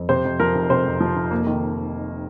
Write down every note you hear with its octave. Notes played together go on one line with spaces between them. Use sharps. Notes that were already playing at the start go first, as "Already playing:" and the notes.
Already playing: F2
C3 C5
F2
F3 A#4
F1
C3 C5
F2
F3
F1
A#3
D#3